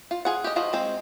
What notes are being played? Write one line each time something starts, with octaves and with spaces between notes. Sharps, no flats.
F4
F4 G#4 F#5
G4 D#5
F3 F4 F#4 D#5
G#3 C4